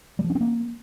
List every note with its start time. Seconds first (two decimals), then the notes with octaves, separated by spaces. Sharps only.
0.19 G3
0.24 F3
0.30 C#4
0.35 C4
0.41 A#3